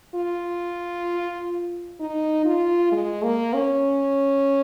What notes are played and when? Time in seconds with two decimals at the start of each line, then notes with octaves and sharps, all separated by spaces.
0.15 F4
2.00 D#4
2.45 F4
2.92 G#3
3.23 A#3
3.53 C#4